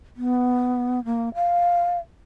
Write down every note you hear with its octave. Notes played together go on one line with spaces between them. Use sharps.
B3
A#3
F5